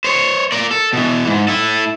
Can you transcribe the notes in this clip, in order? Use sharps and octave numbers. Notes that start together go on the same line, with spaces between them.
C5 C#5
A#4 D5
A4
B2 E3
G#2
E4 A4